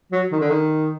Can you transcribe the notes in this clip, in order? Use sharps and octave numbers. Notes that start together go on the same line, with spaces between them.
F#3
D#3
D3
D#3